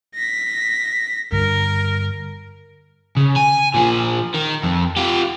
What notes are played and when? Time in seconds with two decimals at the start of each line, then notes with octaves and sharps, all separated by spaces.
0.15 A#6 B6
1.32 G2 D3 A#4
3.17 C#3
3.36 G#5
3.74 A#2 F3
4.34 D#3
4.63 F2
4.96 F4 G4